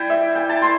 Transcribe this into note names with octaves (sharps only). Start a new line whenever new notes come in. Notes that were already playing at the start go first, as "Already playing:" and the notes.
Already playing: G3 E4 G5
E5
G5
A5
A3 C6